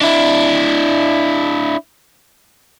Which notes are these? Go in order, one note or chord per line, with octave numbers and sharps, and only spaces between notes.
D4 E4